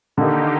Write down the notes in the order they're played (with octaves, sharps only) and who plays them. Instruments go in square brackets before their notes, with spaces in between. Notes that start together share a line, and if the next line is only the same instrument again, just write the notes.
[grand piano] D3 [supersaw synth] D#3 A#3 D#4 G4